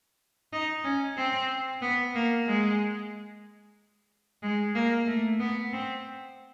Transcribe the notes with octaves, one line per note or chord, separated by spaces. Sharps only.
D#4
C#4
C4
B3
A#3
G#3
G#3
A#3
A3
B3
C4